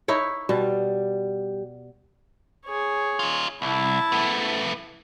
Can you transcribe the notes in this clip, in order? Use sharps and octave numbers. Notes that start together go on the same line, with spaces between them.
D#4 E4 C#5
B2 G3
G#4 C#5
D#4 F4
C2 E4 A5
A3 B3